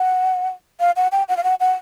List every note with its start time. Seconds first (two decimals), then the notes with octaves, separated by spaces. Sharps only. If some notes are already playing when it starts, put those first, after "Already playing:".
Already playing: F#5
0.80 F5
0.96 F#5
1.12 G5
1.29 F#5
1.37 F5
1.44 F#5
1.60 F#5